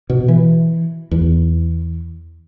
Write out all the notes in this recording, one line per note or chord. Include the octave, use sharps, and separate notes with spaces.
B2
E3
E2